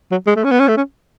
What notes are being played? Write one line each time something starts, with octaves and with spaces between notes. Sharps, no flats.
F#3
G#3
A3
C#4
B3
C#4
A3
C#4